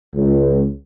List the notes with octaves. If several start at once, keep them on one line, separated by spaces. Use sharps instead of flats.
C#2